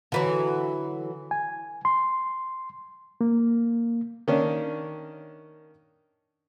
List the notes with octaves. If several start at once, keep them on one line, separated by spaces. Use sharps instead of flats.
D3 E3 F#3
G#5
C6
A#3
D#3 A#3 C#4 D4